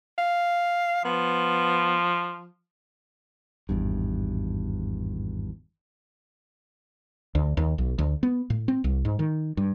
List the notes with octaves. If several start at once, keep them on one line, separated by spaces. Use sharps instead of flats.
F5
F3 B3
G#1 E2 G2
D2
D#2
B1
D2
B3
A2
C4
C2
G#2
D#3
G2